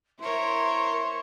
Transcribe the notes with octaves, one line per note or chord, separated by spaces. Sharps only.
E4 A#4 C5 C#5 C6